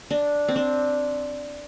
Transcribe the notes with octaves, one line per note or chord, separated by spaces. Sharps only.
D4
C4
D4